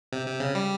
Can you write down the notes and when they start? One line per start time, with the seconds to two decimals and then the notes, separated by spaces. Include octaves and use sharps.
0.13 C3
0.26 C3
0.40 C#3
0.55 G3